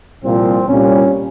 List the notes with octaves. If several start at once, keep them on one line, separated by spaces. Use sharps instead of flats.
C2 A#2 F3 C4
C2 A#2 G3 C#4